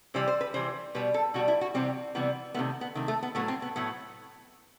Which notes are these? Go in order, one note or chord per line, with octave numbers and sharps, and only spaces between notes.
C3 E3 G3 C5
C5
B4
C3 E3 G3 C5
B2 G3 B4
A4
B2 G3 F#4
E4
F#4
C3 E3 G3 C4
C3 E3 G3 B3
C3 D#3 A3 B3
B3
C3 D#3 A3
A3
B3
A2 F#3 A3 B3
C4
B3
A2 F#3 A3 B3